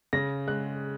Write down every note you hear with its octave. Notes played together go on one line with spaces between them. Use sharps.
C#3 A#6
G#3 F#6